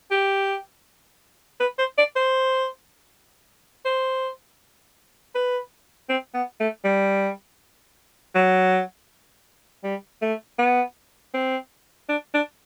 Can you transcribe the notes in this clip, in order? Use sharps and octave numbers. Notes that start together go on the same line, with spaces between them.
G4
B4
C5
D5
C5
C5
B4
C4
B3
A3
G3
F#3
G3
A3
B3
C4
D4
D4